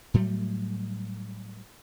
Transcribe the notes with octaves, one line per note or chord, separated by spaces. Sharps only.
A2 F#3 G3 A3